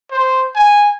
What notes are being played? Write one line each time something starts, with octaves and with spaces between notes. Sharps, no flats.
C5
G#5